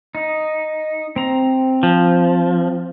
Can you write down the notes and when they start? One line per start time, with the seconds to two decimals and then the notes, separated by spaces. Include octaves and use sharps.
0.15 D#4
1.16 C4 A#5
1.83 F3